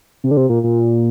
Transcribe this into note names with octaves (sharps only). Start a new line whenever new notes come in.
C3
D3
C3
A#2
A#2